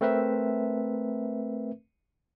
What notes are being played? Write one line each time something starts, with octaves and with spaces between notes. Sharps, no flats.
A3 C4 A#4 B4 E5